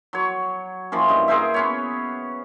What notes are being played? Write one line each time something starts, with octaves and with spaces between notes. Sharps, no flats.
F#3 C#5
E3 F3 A#3 C#4
G2 D#5
G#4 A#4 C5 E5
B3 C#4 C#5